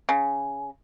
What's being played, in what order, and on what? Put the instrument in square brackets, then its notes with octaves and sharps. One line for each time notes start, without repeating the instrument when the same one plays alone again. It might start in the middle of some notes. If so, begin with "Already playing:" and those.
[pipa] C#3